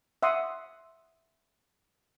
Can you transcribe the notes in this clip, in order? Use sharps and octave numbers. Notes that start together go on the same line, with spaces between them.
E5 F#5 C6 D#6